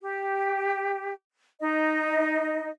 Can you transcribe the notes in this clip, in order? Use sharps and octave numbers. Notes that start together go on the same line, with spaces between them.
G4
D#4 D#5